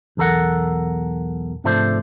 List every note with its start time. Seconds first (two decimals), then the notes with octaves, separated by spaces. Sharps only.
0.17 B1 E2 A4 A#4 F#5
1.64 G#2 C3 F3 A3 D4 C5